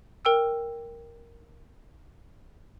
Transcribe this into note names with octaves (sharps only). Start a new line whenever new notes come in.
A#4 G5 E6